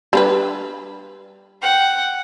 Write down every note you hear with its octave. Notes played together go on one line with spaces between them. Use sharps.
G3 D4 B4
F#5 G5